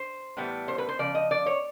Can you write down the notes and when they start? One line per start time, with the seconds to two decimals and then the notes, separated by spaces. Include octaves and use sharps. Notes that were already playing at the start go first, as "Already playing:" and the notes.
Already playing: C5
0.37 A2 E3 G3 B3
0.68 C5
0.78 B4
0.89 C5
0.99 C#3 F3 D5
1.15 D#5
1.31 D5
1.46 C#5